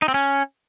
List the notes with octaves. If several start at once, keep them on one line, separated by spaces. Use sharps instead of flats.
D#4
C4
C#4